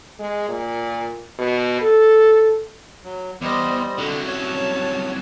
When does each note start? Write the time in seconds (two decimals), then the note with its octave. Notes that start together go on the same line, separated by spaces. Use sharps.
0.19 G#3
0.48 A#2
1.38 B2
1.81 A4
3.04 F#3
3.42 E2 G3 C5 D#5
3.98 C2 D3 F#3
4.27 C#4 C#5 A5